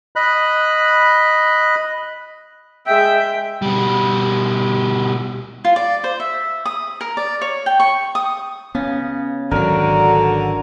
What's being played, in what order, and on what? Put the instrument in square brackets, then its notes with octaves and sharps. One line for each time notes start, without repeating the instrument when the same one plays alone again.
[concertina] D#5 B5 F#6
[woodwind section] G#3 G#4 E5 [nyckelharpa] G5
[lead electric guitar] B2 G3
[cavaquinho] F4
D5
C5
E5
D#6
A#4
D5
C#5
G5
C#6
D#6
[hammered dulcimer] C#3 [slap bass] B3
[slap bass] G#1 F#3 [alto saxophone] D3 [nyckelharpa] F#4 [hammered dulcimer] A#4